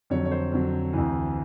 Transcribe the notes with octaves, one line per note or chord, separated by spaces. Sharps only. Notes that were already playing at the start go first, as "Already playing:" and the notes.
F2 D3 F#3 C#5
C#5
C5
F2 D3 F#3
D2 C3 E3